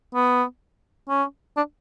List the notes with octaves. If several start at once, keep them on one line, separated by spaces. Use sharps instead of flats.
B3
C#4
D4